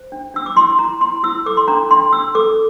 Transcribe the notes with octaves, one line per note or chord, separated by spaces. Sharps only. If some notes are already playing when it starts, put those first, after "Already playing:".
Already playing: C5
D4
D4 E6
D6
E4 C6
E4 A#5
E4 C6
E4 E6
A4 D6
C6
D4 A#5
D4 C6
D4 E6
A4 D6